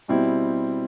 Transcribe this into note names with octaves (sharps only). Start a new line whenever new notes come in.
B2 G3 C4 E4